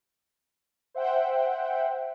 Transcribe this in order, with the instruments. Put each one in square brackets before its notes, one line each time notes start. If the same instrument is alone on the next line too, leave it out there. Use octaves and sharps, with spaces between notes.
[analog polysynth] C5 E5 F#5 G5